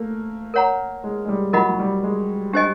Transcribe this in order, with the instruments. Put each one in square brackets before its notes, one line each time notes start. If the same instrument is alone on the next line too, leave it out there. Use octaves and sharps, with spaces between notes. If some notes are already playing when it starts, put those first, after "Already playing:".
Already playing: [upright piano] A3 A#3
[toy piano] A#4 C#5 F#5 A#5
[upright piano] G#3
G#3
G3
[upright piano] F#3 [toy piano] F4 A#4 D#5 F#5 B5
[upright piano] F#3
G3
G#3
[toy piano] D4 G4 C5 D#5 G#5